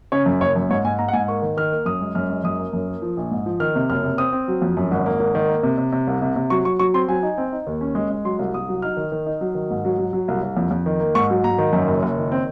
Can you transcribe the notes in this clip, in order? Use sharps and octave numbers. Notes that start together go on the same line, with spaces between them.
C#3 C#5
F#2
F#1 C#5
F#2
G#2 C#5
G#2 G#5
G#2 A#5
F#5
G#2 G#5
A#3 C#6
D#3
D#3 F6
A#3
F#2 D#6
G#3
F#2 F6
G#3
F#2 D#6
A#3
F#2
A#3
F3
A#1
G#2
F3
D#3 F6
C3
F#1 F6
C3
C4 D#6
C4
F#3
F2
F#2
G#1
A#3
G#1
D#3
A#3
C3
C3
C3
C2
C3
C3
F#3 C#6
F#3 C#6
F#3 C#6
C4 C6
F#3 G#5
D#4
C4
D#4
D#2
C#4
G#3
G#3
F#3 C6
C2
C2 D#6
F#3
D#4 F6
D#3
D#3
D#4
F#3
D#3
G#2
F#3
F#3
F#3
C2
C2
F2
F2
D#3
A#3
G#2 C#6
F#3
G#2 A#5
D#3
F#2
F#1
F#1
D#3
C4